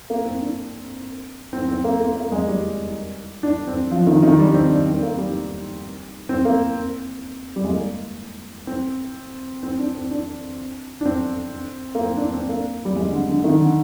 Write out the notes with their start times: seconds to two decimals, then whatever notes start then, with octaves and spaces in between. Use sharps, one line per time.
0.10 A#3
0.25 C4
0.42 D4
1.53 C4
1.69 C4
1.84 A#3
2.00 A#3
2.16 A#3
2.32 G#3
2.48 G3
3.43 D4
3.68 C4
3.91 F3
4.07 D#3
4.23 D#3
4.39 G3
4.50 D4
4.54 C4
4.71 D4
4.86 C4
5.02 A#3
5.18 G3
6.29 C4
6.45 A#3
7.56 G3
7.64 G#3
7.72 A#3
8.67 C4
9.63 C4
9.79 D4
9.95 C4
10.11 D4
11.01 D4
11.06 C4
11.95 A#3
12.01 C4
12.17 D4
12.33 C4
12.49 A#3
12.85 G3
12.96 G#3
13.12 D3
13.28 D3
13.44 D#3
13.60 D3